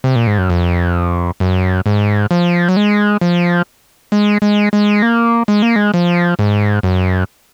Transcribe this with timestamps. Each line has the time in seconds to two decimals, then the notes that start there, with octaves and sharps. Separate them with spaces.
0.04 C3
0.16 A#2
0.27 G#2
0.38 F#2
0.50 F2
1.40 F#2
1.86 G#2
2.31 F3
2.69 F#3
2.77 G#3
3.21 F3
4.12 G#3
4.42 G#3
4.73 G#3
5.02 A#3
5.48 G#3
5.62 A#3
5.76 G#3
5.94 F3
6.39 G#2
6.83 F#2